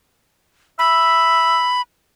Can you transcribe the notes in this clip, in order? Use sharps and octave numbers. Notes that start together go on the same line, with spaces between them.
E5 B5